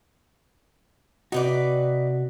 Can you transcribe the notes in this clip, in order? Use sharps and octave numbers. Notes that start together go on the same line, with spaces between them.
C3 D#4 F#4 B4 D5